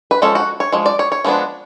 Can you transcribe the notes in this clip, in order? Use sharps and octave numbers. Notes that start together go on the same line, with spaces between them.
B4
F3 G#3 C#4 A4
F#4
C#5
F3 G#3
D5
C#5
C#5
F3 G#3 B3 D4